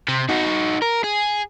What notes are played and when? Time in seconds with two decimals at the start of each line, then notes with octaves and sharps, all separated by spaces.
0.09 C3
0.29 D#4 F#4
0.82 A#4
1.04 G#4